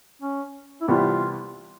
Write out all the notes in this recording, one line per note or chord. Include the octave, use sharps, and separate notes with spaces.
C#4
E4
C2 C3 E3 G3 B3 F4